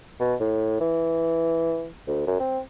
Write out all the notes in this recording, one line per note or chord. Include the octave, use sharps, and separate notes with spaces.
B2
A2
E3
D2
F#2
C4